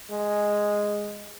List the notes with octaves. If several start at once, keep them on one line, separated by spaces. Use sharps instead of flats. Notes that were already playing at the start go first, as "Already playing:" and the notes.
G#3